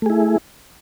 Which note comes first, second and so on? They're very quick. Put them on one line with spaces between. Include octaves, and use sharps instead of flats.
A3 G#4 E4